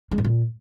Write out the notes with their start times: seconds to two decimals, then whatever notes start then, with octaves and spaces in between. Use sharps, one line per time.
0.11 G#3
0.18 G#2
0.25 A#2